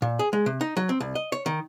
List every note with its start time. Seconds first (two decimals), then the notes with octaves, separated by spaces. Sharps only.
0.02 A#2
0.19 G#4
0.33 G#3
0.46 C3
0.61 D#4
0.77 F#3
0.89 C4
1.00 C2
1.15 D#5
1.32 C#5
1.46 D#3